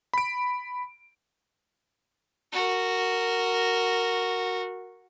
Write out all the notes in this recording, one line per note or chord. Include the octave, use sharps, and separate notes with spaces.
B5 D7
F#4 A#4